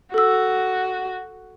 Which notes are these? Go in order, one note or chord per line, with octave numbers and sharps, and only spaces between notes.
F#4 A4 E6